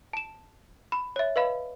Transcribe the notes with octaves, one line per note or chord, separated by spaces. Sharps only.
A5 E7
B5
C#5 E5
B4 D#5 F5 B5